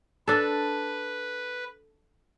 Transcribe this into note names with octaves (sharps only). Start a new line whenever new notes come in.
D4 A4 B4